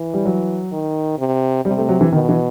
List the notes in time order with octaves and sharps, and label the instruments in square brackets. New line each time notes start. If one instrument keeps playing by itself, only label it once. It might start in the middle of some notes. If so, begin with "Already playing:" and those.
Already playing: [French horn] E3
[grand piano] G3
F#3
[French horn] D#3
C3
[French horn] C3 [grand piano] G3
[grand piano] A3
F#3
E3
[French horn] B2 [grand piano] D#3
[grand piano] E3